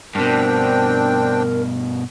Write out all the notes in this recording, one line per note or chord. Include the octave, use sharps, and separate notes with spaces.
G2 B2 C4 D4 A#4 G5